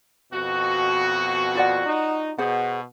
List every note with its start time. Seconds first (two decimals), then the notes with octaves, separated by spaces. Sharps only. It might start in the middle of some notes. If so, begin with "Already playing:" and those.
0.33 F2 B2 F#4
1.55 F4 D5 F#5
1.86 D#4
2.38 B2 G#4 C5 F#5